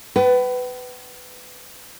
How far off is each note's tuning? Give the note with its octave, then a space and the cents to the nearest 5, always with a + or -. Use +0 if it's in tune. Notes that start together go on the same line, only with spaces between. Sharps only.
B4 +20 G5 -45